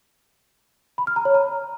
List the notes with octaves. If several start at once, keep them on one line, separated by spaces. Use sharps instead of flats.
B5
F6
A#5
C#5
A#5